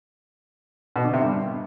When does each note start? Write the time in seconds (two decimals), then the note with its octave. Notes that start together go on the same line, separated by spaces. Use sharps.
0.96 B2
1.05 D3
1.13 C3
1.22 G2